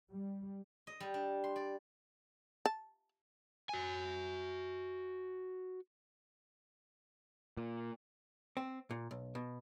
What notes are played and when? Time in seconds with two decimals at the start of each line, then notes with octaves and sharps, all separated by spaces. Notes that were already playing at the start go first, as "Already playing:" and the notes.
0.11 G3
0.87 D#5
1.00 G3
1.14 D4
1.44 C6
1.56 D5
2.66 A5
3.69 F#4 G#5
7.57 A#2
8.57 C4
8.91 A#2
9.11 B1
9.35 B2